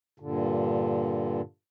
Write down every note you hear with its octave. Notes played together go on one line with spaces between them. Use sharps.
G2 A#2 D3